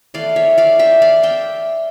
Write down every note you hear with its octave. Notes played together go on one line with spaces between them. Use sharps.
E3 A3 D5 F5
C#5 E5
D5 F5
E5 G5
D5 F5
E5 G5